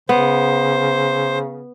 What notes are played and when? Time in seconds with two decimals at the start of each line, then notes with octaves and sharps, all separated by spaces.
0.09 C#3 B3 C5